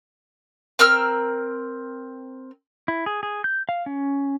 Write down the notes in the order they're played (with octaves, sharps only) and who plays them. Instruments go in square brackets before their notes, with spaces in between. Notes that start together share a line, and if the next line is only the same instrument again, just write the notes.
[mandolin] C4 A#4 E6 F6
[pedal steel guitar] E4
G#4
G#4
G6
F5
C#4